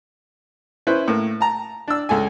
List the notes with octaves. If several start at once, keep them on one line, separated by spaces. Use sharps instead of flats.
C#4 E4 B4 C5
A2 A#3
A5 A#5
D4 E6
C#2 A4 G#5